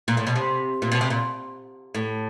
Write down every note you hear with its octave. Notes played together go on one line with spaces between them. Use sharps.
A#2
A2
B2
C3
A#2
B2
C3
A#2
A2